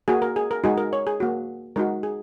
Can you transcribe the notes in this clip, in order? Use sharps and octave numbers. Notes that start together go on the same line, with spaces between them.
A#3 F#4 G#4
A#4
G#4
A#4
G#3 D#4 F#4 G#4
A#4
C#5
G#4
A#3 F#4
G#3 D#4 F#4 A#4
G#4